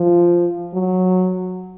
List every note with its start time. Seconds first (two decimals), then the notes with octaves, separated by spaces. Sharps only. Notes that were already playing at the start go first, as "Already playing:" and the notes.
Already playing: F3
0.73 F#3